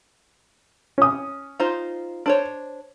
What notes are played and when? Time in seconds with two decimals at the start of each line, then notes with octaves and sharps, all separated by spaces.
0.98 C#4 D#6
1.60 D#4 F4 C5
2.26 D4 C5 C#5